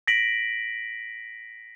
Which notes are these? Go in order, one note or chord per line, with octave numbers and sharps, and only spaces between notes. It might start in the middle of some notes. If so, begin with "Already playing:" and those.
A#6 B6 D7 F#7